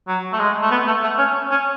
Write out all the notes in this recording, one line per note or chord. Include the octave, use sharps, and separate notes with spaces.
F#3
A3
G#3
A3
B3
A3
A3
C#4
C#4